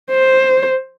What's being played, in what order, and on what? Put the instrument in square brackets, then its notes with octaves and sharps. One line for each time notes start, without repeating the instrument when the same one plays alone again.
[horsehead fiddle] C5